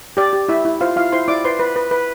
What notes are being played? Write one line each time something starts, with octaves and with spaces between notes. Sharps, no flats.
G4 D5
G4
E4 E5
E4
F4 C5 F5
E4 F4 F5
E4 C5 C6
E4 D5 D6
B4 C5 C6
B4
B4
B4